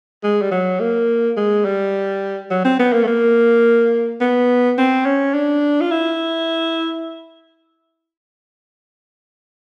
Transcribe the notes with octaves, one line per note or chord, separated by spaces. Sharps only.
G#3
G3
F#3
A#3
G#3
G3
F#3
C4
B3
A#3
A3
A#3
B3
C4
C#4
D4
F4
E4